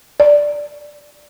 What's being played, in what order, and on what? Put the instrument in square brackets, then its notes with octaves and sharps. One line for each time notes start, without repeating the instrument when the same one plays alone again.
[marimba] D5